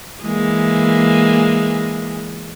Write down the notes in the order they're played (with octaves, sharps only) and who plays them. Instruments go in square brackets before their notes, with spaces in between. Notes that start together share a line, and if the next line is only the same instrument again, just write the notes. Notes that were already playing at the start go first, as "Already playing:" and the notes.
[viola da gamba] E3 G#3 A#3